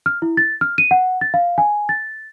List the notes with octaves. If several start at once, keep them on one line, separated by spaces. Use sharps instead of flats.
F6
E4
A6
F6
D#7
F#5
A6
F5
G#5
A6